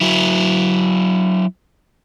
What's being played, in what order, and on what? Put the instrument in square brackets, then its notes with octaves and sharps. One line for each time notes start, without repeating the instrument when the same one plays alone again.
[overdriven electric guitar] F#3 E4